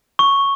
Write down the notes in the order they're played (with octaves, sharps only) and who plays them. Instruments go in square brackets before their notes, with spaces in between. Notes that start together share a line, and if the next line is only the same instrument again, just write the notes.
[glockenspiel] C#6